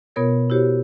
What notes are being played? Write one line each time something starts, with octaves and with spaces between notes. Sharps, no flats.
B2 B3 F4 A#4 C#5 G#6
E4 F#4 G4 C5 C#5